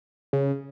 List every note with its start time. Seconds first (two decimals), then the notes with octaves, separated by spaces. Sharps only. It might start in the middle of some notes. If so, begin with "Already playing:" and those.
0.33 C#3